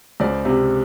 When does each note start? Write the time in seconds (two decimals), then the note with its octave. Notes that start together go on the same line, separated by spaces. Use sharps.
0.20 C#2 C5 D5
0.45 C3